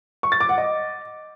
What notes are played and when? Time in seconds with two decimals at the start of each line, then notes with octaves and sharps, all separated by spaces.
0.23 C#6
0.32 A6
0.41 D6
0.49 F#5
0.58 D#5